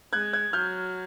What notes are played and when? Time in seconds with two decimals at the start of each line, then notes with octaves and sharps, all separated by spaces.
0.13 G#3 F#6 G#6
0.33 F#6 G#6
0.53 F#3 F6 G6